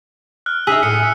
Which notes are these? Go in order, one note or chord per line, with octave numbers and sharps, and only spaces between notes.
F6 F#6
C#3 D#4 G#4 E5 E6 F#6 B6
A2 C#7